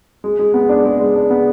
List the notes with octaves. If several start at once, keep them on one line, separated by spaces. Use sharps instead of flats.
G#3
G#3
B3
D4
G#3
G#3
D4
B3